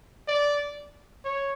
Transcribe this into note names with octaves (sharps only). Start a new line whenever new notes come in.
D5
C#5